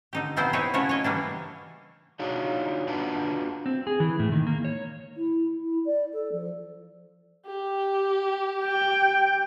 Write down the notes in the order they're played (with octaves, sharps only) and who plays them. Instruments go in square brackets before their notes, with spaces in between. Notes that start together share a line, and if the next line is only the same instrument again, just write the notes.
[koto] D3 D#4 G4
A#2 F3 B3 C4 E4 C5
C4 D#4 E4 B4 C#5
C#3 G#3 A3 E4 F#4 C#5
C#5 D#5
E3 G3 A#3 D4
[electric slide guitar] D4 D#4 F4 F#4 C#5
D4 F4 F#4 B4 A5
C4
G#4
E3
A2
D#3
A#3
C#5
[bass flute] E4
E4
D5
A4
F3
[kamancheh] G4
[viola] G5